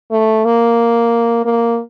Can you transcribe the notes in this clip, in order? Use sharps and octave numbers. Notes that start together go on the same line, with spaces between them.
A3
A#3
A#3